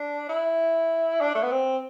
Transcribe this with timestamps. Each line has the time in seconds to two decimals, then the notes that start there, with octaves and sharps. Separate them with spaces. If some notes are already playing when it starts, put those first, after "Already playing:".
Already playing: D4
0.29 E4
1.21 D4
1.35 A3
1.43 B3
1.51 C4